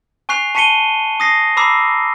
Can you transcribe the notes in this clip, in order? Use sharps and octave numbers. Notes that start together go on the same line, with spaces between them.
G#5 C#6 F#6 C7 F7
A5 C#6 B6 C#7 D#7 G7
D#6 A#6 C7
A#5 B5 D6 E6 C7